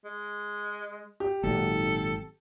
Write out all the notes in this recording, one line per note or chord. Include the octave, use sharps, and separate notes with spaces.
G#3
G4
G#1 A#2 F#3 A4